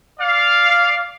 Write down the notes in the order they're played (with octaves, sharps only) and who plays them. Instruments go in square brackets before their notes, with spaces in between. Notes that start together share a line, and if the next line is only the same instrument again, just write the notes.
[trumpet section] D5 F5